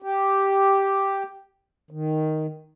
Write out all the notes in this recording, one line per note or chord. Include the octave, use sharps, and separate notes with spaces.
G4
D#3